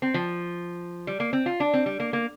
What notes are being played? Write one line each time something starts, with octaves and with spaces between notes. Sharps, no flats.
C4
F3
G3
A#3
C4
F4
D4
C4
G3
A#3
A#3